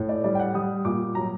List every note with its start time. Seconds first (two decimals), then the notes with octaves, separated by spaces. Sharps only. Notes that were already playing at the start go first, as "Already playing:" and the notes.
Already playing: A2
0.09 D5
0.24 G3 D5
0.35 G5
0.39 F#5
0.54 G3 D#6
0.85 A#2 D6
1.15 F#3 A#5